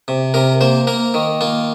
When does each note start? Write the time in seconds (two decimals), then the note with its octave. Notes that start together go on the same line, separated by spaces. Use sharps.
0.08 C3
0.34 C3 A#4
0.61 A#3 C5
0.87 A#3 A#4
1.14 D#3
1.41 A#3 F4